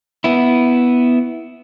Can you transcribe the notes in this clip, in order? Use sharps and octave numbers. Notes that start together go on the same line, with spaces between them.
B3 E4